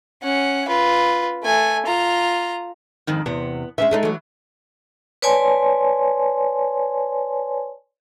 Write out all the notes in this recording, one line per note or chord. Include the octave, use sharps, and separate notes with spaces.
C#4 F#5
F4 B4
A3 G#5
F4 A#5
F2 G#2 D#3
E2 C3 B3
E3 G#3 C#4 E5
G#3 A3 D#4
E3 F#3
B4 C#5 D5 G#5 A5 C6